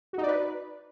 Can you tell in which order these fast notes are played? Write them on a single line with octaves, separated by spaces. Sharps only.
F#4 D#4 D5 B4